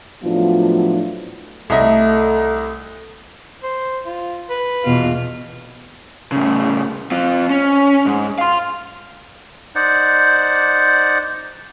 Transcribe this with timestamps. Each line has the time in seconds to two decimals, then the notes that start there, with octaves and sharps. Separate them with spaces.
0.23 A2 F3 F#3 B3 D4 F4
1.70 C2 A3 A4 D#5 E5 A5
3.63 C5
4.06 F4
4.50 B4
4.84 E2 B2 F4
6.32 A2 C#3
7.12 C4 F4
7.50 C#4
8.06 G#2
8.38 F5 C6
9.75 D#4 C5 D5 F#5